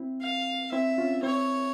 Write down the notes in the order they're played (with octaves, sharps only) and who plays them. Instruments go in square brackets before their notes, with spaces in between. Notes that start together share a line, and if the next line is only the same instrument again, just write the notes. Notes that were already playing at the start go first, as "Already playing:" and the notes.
Already playing: [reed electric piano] C4 E4
[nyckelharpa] F5
[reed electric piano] C4 E4 [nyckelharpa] E5
[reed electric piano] C#4 F4
[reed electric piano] C4 E4 [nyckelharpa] C#5